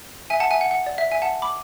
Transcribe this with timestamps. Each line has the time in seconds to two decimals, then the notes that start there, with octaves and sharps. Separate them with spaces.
0.30 E5 G#5
0.40 F#5 A5
0.51 E5 G#5
0.61 F#5
0.71 F#5
0.86 D5
0.98 E5
1.12 E5 G#5
1.22 F#5 A5
1.42 B5 D6